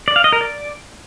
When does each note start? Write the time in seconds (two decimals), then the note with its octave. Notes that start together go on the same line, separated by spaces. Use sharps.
0.08 D5
0.16 F5
0.24 D#5
0.32 A#4
0.41 D5